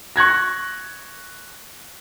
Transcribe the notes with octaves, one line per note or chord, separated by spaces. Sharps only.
C#6 F#6 G#6 A#6